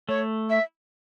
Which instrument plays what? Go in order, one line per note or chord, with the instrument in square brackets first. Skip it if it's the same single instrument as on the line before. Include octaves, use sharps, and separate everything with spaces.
[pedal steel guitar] A3 [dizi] C#5
[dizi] E5